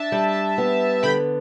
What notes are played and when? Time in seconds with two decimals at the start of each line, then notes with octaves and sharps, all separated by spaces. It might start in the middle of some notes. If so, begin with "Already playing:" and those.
Already playing: D4 E5 A5
0.12 G3
0.58 B3
1.03 D3 G5 B5